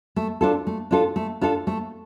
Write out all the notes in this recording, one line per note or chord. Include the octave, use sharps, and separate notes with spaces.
A3
D4 F4 A4
A3
D4 F4 A4
A3
D4 F4 A4
A3